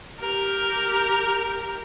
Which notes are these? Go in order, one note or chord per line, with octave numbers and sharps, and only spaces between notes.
G4 A#4